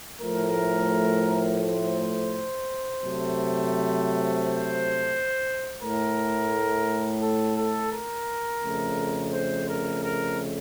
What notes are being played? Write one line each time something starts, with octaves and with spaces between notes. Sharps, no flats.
A2 F3 A3 A#4
C5
C3 F#3 A3
C5
A2 A3 A#4
A4
A4
A#4
F2 C#3 A3
C5
A#4
A#4